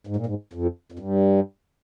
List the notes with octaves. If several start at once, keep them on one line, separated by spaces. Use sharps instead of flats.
G#2
A#2
G#2
F2
F2
G2